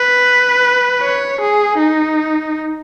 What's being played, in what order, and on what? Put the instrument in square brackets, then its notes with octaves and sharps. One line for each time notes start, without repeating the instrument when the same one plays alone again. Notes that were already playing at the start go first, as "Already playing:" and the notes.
Already playing: [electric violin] B4
C#5
G#4
D#4